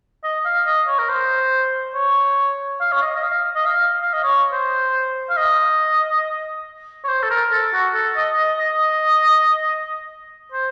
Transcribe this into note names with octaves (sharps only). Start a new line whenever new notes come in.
D#5
F5
D#5
C#5
A#4
C5
C#5
F5
C#5
D#5
D#5
F5
D#5
F5
F5
D#5
C#5
C5
F5
D#5
C#5
C5
A4
A#4
A4
F#4
A4
D#5
D#5
D#5
C5